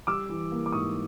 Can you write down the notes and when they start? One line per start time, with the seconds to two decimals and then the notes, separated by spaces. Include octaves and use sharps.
0.07 G3 D6 E6
0.29 E3
0.52 A#3
0.66 D6
0.72 G#2 C#6 D#6